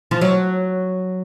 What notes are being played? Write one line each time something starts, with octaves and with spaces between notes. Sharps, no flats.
F3
F#3